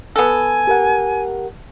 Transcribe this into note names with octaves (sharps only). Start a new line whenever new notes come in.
B3 A4 G#5
G4 A#4 F#5